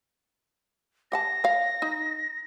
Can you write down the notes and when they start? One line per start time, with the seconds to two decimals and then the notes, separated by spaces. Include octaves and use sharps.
1.12 G4 F#5 A5 A#6
1.44 C#5 F5
1.82 D#4